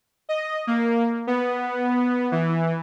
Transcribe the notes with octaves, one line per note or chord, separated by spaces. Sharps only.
D#5
A#3
B3
E3